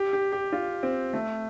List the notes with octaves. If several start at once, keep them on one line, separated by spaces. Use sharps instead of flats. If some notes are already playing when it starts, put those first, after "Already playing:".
Already playing: G4
G4
G4
F4
C4
A3